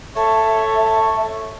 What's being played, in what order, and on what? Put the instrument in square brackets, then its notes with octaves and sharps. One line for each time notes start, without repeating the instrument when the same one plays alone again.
[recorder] A4 [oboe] C#5 [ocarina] E5